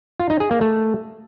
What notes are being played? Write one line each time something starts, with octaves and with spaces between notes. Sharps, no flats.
F4
D#4
G#4
A#3
A3